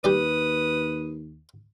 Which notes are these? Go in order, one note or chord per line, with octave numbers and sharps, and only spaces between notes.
D#2 G3 G4 B4 D5 D#6